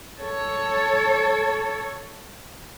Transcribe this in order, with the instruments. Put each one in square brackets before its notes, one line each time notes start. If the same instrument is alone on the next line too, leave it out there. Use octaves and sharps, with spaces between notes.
[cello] A4 C#5